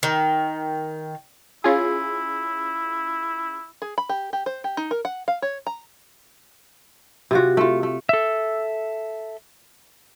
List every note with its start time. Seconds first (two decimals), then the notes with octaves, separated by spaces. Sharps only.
0.03 D#3
1.64 C#4 E4 F4 G#4
3.82 G#4
3.98 B5
4.09 G4
4.33 G4
4.46 C5
4.64 G4
4.77 D#4
4.91 A#4
5.05 F#5
5.28 F5
5.42 C#5
5.67 A#5
7.31 C3 F4 F#4
7.57 A3 F4
7.83 A3
8.09 A4 E5